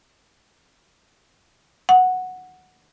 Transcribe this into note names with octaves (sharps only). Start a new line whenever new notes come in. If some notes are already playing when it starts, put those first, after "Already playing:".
F#5